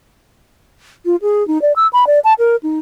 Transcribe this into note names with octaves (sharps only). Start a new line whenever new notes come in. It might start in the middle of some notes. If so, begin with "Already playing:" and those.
F4
G#4
D#4
D5
E6
B5
D5
A5
A#4
D#4